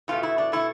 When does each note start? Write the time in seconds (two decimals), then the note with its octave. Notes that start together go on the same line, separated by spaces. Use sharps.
0.08 E2 B2 A3 F4
0.23 E4
0.38 D4
0.52 B2 A3 E4